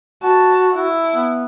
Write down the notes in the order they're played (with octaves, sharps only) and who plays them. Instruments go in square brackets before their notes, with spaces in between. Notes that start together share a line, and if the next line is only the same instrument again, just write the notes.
[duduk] F#4 [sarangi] A5
[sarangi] E4
[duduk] B3